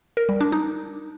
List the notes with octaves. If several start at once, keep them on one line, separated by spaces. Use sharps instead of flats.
A#4
G3
D4
D#4